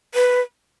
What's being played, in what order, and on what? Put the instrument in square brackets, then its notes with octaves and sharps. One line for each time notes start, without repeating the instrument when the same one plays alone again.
[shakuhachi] B4